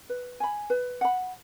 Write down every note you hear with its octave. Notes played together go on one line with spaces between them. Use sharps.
B4
G#5 B5
B4
F#5 B5